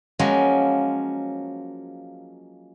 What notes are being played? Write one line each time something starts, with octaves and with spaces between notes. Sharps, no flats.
F3 F#3 G#3 A#3 C#4